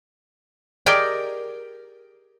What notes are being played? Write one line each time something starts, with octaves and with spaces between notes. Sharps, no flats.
G4 G#4 A#4 D5 D#5 G5